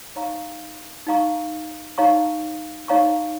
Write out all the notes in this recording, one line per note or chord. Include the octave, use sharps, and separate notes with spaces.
D#4 C#5 F5 A#5 C#6
D#4 C#5 F5 A#5 C#6
D#4 C#5 F5 A#5 C#6
D#4 C#5 F5 A#5 C#6